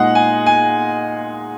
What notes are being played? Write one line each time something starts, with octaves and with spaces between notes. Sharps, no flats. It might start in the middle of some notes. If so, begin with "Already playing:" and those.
Already playing: A#2 G#3 D#4 F#5
G#5
G#5